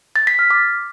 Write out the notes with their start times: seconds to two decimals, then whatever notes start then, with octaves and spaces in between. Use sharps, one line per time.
0.16 A6
0.27 B6
0.39 F6
0.50 D6